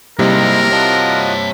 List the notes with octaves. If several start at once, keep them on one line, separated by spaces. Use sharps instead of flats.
C3 G3 A#3 D#4 E4 G#4 A#4 F5
F4 F#4 C#5 D#5 A5